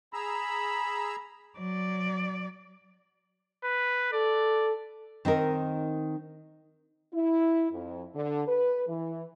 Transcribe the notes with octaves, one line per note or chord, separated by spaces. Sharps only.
G#4 A#5 B5 E6
F#3 D5
B4
A4 D5
D#3 C4 D#4 A#4
E4
F2
D3
B4
E3